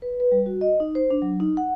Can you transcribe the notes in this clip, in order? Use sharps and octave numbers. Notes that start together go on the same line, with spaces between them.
B4
B4
G3
F#4
D#5
D#4
C5
D4
F#3
D#4
F#5